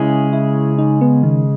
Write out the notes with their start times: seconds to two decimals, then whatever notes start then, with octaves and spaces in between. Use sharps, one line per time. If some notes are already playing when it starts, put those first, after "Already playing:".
Already playing: C#3 G#3 C#4 E4 G#4
0.33 E4
0.78 D#4
1.01 B3
1.23 D#3